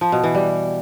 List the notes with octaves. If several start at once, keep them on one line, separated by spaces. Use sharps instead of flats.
F3
B2
E3
G3